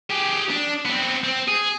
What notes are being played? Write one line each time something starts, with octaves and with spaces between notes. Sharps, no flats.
G4 G#4
D4
B3 C4
C4
G#4